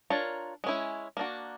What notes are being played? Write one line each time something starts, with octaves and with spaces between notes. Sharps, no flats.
D4 F4 A#4 C#5
G#3 C#4 E4
A#3 D4 F#4